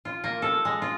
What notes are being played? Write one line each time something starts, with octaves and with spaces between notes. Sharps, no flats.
F4
A#3
A4
G#3
F4